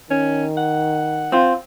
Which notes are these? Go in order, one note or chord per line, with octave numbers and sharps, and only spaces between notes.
D#3 C#4
F#5
C4 F4